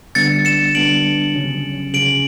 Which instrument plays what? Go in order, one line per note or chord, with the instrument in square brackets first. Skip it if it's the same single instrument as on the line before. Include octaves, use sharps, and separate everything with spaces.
[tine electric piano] D3 G3 B3 D4 [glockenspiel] A6 C#7
[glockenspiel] C#7 E7
[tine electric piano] D3 G3 B3 D4 [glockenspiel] D7 F#7
[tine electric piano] C#3 F#3 C#4
[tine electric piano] C#3 F#3 C#4 [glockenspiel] D7 F#7